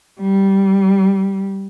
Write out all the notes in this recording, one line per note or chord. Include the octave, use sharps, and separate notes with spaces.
G3